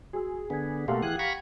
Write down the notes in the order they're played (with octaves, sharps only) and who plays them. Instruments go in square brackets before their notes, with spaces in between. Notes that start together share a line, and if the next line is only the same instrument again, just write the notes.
[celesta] F#4 E6 [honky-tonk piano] G#4
[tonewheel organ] D3 B3 [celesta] G#5 G#6
[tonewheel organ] B2 A3 A#3 [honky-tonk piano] G4 F5 F#5 [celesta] C6 E6
[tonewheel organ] E3 G#4 F#6 [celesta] G5 G#6 D#7
[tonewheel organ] A#5 B5 C#6